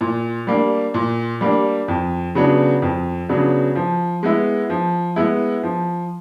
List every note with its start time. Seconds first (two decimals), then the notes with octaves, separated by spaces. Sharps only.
0.01 A#2
0.47 G3 A#3 D4
0.94 A#2
1.41 G3 A#3 D4
1.88 F2
2.35 C#3 F#3 B3 D4
2.82 F2
3.29 C#3 F#3 B3 D4
3.75 F3
4.23 G#3 B3 E4
4.70 F3
5.16 G#3 B3 E4
5.63 F3